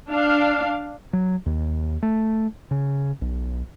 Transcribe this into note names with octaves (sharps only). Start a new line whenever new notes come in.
D4 F5
F#3
D#2
A3
C#3
B1